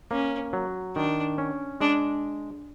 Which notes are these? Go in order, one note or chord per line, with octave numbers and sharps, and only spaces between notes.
A#3 C#4
F#3
D#3 D4
C#4
G#3 D4